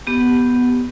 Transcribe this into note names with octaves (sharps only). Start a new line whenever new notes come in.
B3 G4